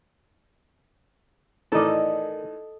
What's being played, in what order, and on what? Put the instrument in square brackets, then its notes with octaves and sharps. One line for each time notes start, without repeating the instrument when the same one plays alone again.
[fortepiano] A2 D#3 E3 [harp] A4 D#5 [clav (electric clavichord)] A#4 D5